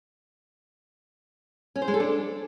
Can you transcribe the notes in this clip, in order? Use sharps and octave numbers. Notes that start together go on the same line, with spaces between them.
C#4
C5
G#3
A4
D4